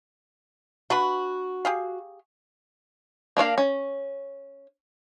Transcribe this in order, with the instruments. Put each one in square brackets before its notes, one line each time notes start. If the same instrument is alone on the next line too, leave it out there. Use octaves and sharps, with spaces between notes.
[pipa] D4 B4 B5 [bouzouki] F#4
[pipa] G4 G#4 F5
[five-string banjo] A#3 D4 C#5 F5
C#4